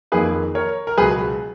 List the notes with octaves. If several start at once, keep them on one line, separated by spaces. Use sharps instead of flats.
F2 D#3 A#3 G#4 B4
A#4 C#5
A#4
C#2 B2 F#3 G#4 B4